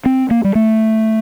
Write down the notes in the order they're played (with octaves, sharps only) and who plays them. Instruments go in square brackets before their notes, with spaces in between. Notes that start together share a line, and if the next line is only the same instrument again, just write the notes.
[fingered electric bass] C4
A#3
G3
A3